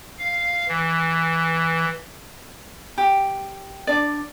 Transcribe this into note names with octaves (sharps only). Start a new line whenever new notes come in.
F5
E3
G4
D4 D5